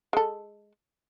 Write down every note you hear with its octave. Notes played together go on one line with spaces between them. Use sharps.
G#3 A4